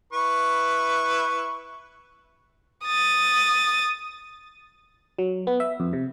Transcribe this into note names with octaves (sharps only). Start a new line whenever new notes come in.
E4 B4 C#6
D#6 A6
F#3
B3
E5
F2
C3